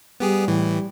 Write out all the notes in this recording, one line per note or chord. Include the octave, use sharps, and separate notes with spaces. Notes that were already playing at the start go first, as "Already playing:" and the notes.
G3 B3 G4 G#4
A2 E3